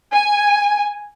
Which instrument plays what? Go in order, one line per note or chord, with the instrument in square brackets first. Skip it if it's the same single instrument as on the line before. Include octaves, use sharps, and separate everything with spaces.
[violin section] G#5